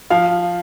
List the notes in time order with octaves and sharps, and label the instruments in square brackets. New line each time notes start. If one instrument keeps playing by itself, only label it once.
[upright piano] F3 F5